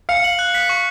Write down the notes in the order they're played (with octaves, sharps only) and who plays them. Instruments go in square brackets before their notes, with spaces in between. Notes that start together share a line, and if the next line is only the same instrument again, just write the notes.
[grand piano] F5 [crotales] C#7
[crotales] F#7
F#6
B6
C#6